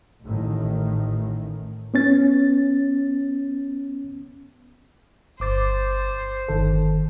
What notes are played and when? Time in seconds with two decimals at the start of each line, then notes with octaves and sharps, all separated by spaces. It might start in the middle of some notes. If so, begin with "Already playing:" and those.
0.25 A1 A2 D#3
1.94 B3 C#4 A6
5.40 G1 C5 D6 A6
6.48 G1 D#3 A4